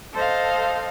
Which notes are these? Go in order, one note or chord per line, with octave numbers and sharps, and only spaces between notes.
A4 C5 D#5 F5